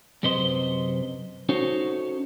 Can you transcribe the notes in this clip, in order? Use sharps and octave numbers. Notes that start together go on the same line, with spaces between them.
F#2 C3 B4 C5 D#5 C6
C#4 D#4 F#4 A4 C5 C#5